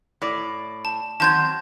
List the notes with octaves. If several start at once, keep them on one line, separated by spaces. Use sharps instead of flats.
A2 D5
A5
D#3 F#3 C4 A5 G6 G#6